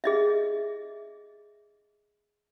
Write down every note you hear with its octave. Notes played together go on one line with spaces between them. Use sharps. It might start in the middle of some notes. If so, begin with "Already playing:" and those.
G#4 D#5 E5